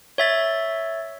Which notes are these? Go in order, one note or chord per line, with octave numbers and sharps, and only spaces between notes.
C#5 E5 A6